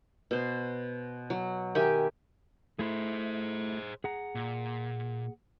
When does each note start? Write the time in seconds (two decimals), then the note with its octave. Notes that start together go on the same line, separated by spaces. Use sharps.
0.31 B2 C5
1.30 F#3
1.75 D#3 G4 E5 G#5
2.79 A3 E4 G#4 C5
4.04 G#4 F#5 A#5
4.35 A#2